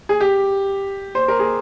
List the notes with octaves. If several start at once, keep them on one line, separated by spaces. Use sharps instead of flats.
G#4
G4
C5
A#4
G#4